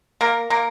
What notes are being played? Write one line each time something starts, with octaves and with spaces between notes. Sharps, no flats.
A#3 A#4
A#3 A#4